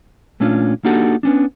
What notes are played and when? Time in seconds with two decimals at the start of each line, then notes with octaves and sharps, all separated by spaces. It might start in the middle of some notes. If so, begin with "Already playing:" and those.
0.40 A#2 A3 C#4 D4 F4
0.85 A#3 D4 D#4 F#4 G4 A4
1.23 B3 C#4 D4